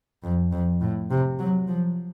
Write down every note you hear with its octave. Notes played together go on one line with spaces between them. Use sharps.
F2
F2
A2
C3
F#3
F3